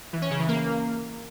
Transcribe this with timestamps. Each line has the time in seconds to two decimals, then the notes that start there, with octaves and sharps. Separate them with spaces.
0.13 E3
0.22 C#4
0.31 C#3
0.39 E3
0.48 A#3